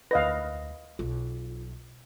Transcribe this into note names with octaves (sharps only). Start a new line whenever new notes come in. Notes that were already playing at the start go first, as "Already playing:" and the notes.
D2 B4 D#5 F5 A#6
B1 F4